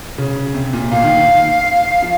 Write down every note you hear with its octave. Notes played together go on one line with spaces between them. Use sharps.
C#3
C3
A#2
A#2 F5
D#3
F3